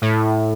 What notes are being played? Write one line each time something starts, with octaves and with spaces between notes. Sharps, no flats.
A2